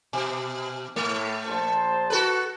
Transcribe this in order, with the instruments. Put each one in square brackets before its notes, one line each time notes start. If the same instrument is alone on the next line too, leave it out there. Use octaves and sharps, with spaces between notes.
[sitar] B2
[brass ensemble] A2 [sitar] A3
[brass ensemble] A#1 C5 A5
[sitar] F#4 A4 B4